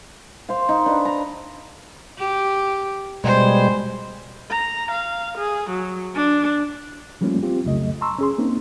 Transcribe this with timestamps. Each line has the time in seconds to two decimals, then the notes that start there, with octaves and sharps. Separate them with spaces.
0.49 C5 F5
0.69 D#4
0.86 D4 B4
1.05 A#5
2.18 G4
3.24 B2 G3 G#3 C5
4.50 A#5
4.91 F5
5.38 G#4
5.70 F#3
6.15 D4
7.21 F3 G3 A3 A#3 C#4 F4
7.43 C4 F4 G4
7.64 C2 F2 C#3 F#3 A3 D#5
8.01 A5 A#5 C6 C#6 E6
8.19 C#4 G#4 C6
8.38 A#3 C4 C#4 D#4